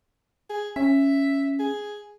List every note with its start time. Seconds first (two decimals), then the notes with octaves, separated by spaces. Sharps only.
0.49 G#4
0.76 C#4 E5
1.59 G#4